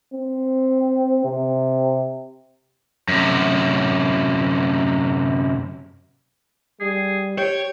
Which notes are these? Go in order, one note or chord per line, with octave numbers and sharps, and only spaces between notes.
C4
C3
F#2 C3
G3 G#4
G4 C#5 G5